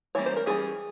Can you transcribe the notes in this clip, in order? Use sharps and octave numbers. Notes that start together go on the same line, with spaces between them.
E3 G3 A#3 C#4 C#5
C5
A#4
E3 G3 C#4 G#4